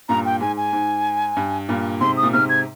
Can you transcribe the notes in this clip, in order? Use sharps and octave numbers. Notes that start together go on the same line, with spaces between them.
G2 A#2 A#5
G5
G#2 G#5
G#5
G#2
G2
G2 A#2
G#2 C3 C6
D#6
A#2
G#2 C3 F6
G#6